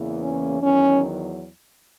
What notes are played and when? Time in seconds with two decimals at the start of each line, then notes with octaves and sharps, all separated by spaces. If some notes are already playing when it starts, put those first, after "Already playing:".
Already playing: E2 C#3 E3 A#3
0.18 C#4
0.61 E2 D#3 F#3 C#4